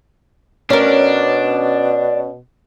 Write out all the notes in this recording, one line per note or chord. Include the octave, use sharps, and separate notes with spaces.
B2 C#4 D4 A#4